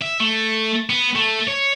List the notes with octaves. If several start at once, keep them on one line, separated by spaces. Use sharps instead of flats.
E5
A3
B3
A3
C#5